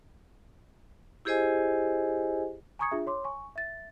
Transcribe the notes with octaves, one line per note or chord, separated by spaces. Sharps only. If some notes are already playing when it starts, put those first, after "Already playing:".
E4 G4 G#4 C5 D#5 G#5
G#5 A#5 C#6 D#6 G#6 C#7
D4 F4 G#4 E5
C#5 C6 D6
G#5 C#6
E5 A6